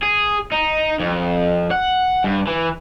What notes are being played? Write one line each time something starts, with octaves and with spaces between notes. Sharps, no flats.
G#4
D#4
F2
F#5
G2
E3